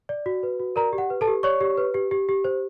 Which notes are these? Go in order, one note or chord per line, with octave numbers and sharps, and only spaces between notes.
D5
F#4
B4
F#4
A#4 D5 A#5
G4
F#5
B4
A4 A5
G4
C#5 D5 C#6
G4
B4
G4
G4
G4
C5